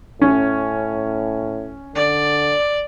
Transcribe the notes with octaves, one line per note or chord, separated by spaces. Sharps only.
A2 C#4
D3 D5